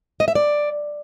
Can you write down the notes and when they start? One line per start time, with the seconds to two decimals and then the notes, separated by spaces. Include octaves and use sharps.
0.20 D#5
0.28 E5
0.35 D5